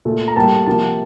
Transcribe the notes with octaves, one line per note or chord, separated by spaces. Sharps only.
A#2 A3
A#5
A2 G3 A#3 A5
C3 F3 A#3 A5